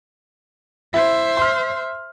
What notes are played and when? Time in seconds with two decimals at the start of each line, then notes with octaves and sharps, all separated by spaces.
0.94 E4 C5 E5
1.37 C6 F6